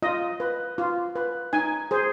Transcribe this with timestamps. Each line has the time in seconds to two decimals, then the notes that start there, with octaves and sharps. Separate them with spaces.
0.02 F4 D#5
0.40 B4
0.78 F4
1.16 B4
1.53 D#4 G#5
1.91 G#4 C5